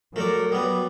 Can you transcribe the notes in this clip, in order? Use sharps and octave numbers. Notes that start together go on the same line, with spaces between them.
F#3 A3 A4 A#4 D5
G3 B3 D#6